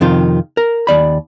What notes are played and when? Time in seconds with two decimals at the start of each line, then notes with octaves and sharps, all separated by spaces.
0.01 F2 C3 D#3 F4
0.57 A#4
0.87 D#2 D5 B5